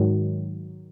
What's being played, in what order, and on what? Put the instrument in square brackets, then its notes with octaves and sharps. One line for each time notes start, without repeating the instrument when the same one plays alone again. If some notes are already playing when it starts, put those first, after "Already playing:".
Already playing: [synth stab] G#2 D#3 F#3